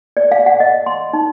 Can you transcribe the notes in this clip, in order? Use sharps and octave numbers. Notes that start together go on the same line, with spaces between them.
D5
F5
F#5
D#5
C6
D#4